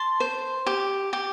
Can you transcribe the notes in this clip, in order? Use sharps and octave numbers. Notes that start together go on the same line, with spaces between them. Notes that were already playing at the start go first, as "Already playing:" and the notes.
Already playing: A5 C6
C5
G4
G4